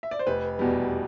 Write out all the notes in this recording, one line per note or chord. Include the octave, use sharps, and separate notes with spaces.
E5
D5
C5
F1 B4
E2 B2 G3